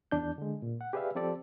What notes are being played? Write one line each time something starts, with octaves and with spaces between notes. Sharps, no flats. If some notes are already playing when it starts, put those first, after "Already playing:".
E2 D4 G6
D3 G#3
A#2
F#5
G4 G#4 B4 D5 E5 F5
F3 C4 G4 A4 D5